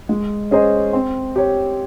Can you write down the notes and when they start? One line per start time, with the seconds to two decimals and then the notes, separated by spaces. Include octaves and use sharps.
0.09 G#3
0.51 C#4 G#4 C5 D#5
0.93 C4
1.36 G4 C#5